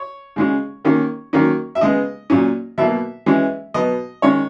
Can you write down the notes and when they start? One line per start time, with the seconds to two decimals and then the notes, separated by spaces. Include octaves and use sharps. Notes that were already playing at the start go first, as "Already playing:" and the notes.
Already playing: C#5
0.36 C#3 G#3 C#4
0.85 D#3 A#3 C#4
1.33 D#3 F#3 A#3 C#4
1.75 E5
1.81 C#3 G#3 B3 D#5
2.30 A#2 F#3 C#4
2.78 B2 F#3 A#3 E5
3.26 E3 G#3 C#4
3.74 B2 F#3 B3 D#5
4.22 D#3 G#3 C#4 C#5